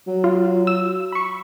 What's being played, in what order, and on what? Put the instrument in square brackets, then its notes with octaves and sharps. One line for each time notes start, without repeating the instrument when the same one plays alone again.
[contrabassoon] F#3
[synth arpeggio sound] F4
E6
B5 C#6